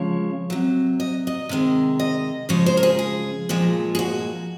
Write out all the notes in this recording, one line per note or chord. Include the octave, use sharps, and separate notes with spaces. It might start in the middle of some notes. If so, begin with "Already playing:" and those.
Already playing: C#3 F3 G#3 C#5
C3 F#3
D#5
D#5
C3 D#3 G#3
D#5
C#3 F3 G#3 C#5
C5
A#4
G#4
G#4
A#2 F3 G#3
G#4
F#4